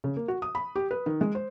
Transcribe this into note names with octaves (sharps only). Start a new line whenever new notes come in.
C#3
A#3
F#4
D#6
B5
G4
B4
D#3
G#3
C5